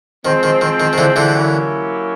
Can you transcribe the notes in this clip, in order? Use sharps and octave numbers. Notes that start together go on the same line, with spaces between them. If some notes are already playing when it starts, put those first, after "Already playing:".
D#3 F3 G#3 C4
D#3
D#3
D#3
D#3
D3 E3
D3 E3
F#3 A#3 C#4 E4 G4